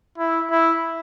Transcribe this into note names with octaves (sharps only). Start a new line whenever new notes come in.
E4
E4